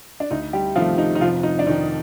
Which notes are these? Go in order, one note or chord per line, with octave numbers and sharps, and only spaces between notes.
D4
D2 D#4
G3 G4
C3 D#3 F3 A3 F4
D#4
D#4
F1 F3 F4
D#4
D4
F2 D#3 D#4